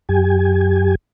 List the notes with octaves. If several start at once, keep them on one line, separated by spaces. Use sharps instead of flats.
F#2 G4 G#5